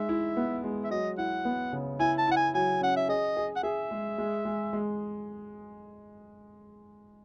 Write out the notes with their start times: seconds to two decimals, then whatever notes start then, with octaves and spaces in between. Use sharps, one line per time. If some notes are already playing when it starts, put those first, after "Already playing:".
Already playing: G#3 D#4 E5
0.09 E4
0.37 B3
0.64 G#3
0.84 E5
0.90 F#3 D#5
1.18 E4 F#5
1.45 B3
1.73 C#3
2.00 E4 G#5
2.18 A5
2.27 E4 F#5
2.37 G#5
2.54 F#3 G#5
2.81 C#4 F#5
2.96 E5
3.09 G#4 D#5
3.37 G#4
3.56 F#5
3.63 G#4 E5
3.91 G#3
4.18 G#3
4.45 G#3
4.73 G#3